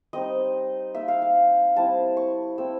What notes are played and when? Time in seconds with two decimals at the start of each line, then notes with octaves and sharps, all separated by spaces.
0.13 G3 C4 D#4 D#5
0.95 A#3 D#4 E5
1.08 F5
1.22 F5
1.76 G3 C4 E4 A5
2.17 C#6
2.58 A3 C4 E4 E6